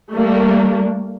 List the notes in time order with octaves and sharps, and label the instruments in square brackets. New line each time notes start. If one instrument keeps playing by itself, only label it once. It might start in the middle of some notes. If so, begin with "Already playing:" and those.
[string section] G3 A3 A#3 D4